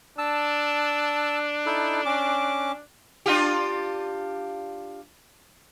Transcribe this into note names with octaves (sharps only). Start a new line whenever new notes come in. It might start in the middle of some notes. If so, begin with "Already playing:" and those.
D4 A5 E6
D#4 E4 A4
C#4 D6
D4 F4 G4